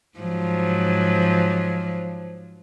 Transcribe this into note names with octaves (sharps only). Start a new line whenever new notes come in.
G#2 F3 F#3